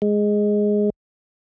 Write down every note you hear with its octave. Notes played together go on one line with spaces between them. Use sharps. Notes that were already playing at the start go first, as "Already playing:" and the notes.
G#3